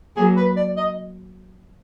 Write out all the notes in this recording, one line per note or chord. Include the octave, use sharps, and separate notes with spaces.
F#3 A#3 G#4
B4
D5
D#5